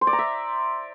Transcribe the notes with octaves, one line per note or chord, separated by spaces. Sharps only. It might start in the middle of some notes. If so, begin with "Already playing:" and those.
C5
D5
A#5
E5